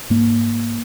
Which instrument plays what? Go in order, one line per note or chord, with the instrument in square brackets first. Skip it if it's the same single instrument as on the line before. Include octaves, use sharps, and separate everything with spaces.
[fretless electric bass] G#2 A#3